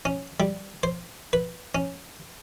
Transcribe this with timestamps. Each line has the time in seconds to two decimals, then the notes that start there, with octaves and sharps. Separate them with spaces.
0.05 C#4
0.40 G3
0.83 C5
1.33 B4
1.75 C#4